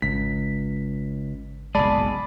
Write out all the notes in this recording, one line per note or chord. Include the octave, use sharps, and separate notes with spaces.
G#1 C#2 B6
F#1 B1 G#3 G#4 D5 A5 B5